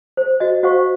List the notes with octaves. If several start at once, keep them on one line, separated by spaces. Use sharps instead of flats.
C5
F#4 D#5
F#4 C5 F5 F#5 C#6